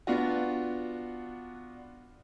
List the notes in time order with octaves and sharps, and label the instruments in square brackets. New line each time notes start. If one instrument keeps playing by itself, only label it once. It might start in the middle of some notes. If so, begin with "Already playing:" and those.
[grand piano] B3 D4 F4 F#4